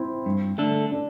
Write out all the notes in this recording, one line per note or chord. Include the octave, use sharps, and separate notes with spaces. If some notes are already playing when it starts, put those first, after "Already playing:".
Already playing: C4 E4
G2
D3 A3 D4 A4
D4